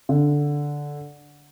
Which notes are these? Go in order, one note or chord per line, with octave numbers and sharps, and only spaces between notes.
D3